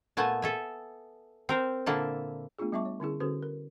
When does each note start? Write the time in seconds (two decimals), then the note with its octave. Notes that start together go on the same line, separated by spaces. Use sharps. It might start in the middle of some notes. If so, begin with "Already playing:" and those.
0.17 A#2 A3 B3 G#5 A5
0.42 A4 E5 G#5
1.49 C4 A#4 C5
1.86 A#2 D3 A#3 E4 A5
2.59 A3 B3 D4 F4 G#4
2.72 G3 B3 E5 A5 C#6 D6
2.85 C#5
3.00 D3 C#4 E4 G#4
3.20 D3 C#4 F#4 A4 B4 C5
3.43 A#4